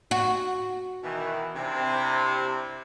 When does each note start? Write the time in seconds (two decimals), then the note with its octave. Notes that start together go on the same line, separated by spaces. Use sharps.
0.11 F#4
1.03 B2 D#3 E3
1.56 C3 C4 D4 E4